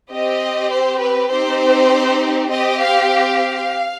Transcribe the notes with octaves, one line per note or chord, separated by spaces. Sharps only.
C4 G4 D#5
C5
B4
C4 D#4 G4 C5
C4 G4 D#5
F5
F5